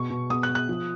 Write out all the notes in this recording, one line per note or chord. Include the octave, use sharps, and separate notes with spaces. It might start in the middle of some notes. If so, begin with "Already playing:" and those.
Already playing: B2 C#6
B2
B3 D#6
F#6
B3
F#6
F3